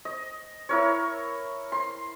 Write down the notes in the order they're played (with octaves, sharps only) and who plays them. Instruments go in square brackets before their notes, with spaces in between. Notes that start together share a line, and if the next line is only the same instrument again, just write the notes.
[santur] D#5
E4 A#4 C#5
C6